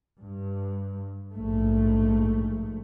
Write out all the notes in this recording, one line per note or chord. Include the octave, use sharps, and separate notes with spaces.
G2
A#1 G#2 A3